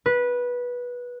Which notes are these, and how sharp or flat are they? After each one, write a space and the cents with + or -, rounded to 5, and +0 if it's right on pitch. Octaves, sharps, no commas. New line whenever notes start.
B4 -15